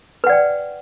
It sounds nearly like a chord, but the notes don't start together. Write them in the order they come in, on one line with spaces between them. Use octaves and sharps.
B4 F#5 D5 G5